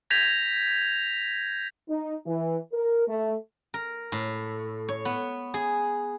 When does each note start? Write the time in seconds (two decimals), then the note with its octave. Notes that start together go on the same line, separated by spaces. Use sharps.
0.10 G6 G#6 A#6 B6 F7
1.88 D#4
2.26 E3
2.72 A#4
3.07 A3
3.74 A#4
4.12 A2
4.89 C#5
5.05 B3
5.54 G#4